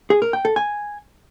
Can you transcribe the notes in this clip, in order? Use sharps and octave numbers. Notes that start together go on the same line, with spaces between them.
G#4
A#4
G5
A4
G#5